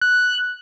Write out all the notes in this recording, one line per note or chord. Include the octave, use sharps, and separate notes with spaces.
F#6